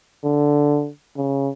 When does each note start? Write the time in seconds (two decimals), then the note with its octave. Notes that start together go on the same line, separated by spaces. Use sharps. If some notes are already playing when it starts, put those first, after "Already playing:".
0.24 D3
1.17 C#3